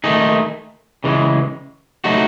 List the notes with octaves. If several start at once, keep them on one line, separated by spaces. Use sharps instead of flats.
D#3 A3 D#4 G#4
C#3 E3 G#3
F#3 A3 D#4 F#4